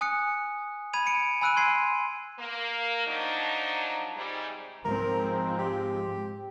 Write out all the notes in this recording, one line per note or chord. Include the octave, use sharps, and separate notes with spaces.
G#5 D#6 F#6 C#7
B5 G#6 D#7 F7
C#7 D7
G#5 B5 E6 F#6 D7 D#7
C6 G#6 C7
A#3
F3 F#3 D4 D#4
G#2 C3 G3
F2 G#2 F3 G#3 C4 A#4
G4